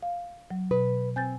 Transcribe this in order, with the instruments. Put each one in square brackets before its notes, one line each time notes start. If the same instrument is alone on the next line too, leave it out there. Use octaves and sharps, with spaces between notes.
[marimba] F5
F#3
[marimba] B2 [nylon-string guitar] B4
[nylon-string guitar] C4 [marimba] G#5 G6 A6